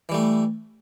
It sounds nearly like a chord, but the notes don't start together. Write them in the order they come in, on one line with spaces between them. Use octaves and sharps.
E3 G3 A3